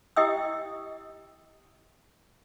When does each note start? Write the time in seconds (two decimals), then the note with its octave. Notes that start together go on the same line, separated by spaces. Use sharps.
0.16 E4 G4 D#5 G5 D#6 E6